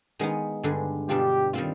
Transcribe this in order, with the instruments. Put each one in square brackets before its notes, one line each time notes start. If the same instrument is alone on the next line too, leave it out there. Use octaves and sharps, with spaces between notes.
[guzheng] D#3 G#3 B3 D#4
G2 D3 G#3
[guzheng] B2 G3 D4 F4 [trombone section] G4
[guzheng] D#3 G3 C4 F4